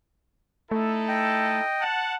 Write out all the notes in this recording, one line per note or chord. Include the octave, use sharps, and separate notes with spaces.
A3 D#4 E4 A4
D#5 G5
F#5 A5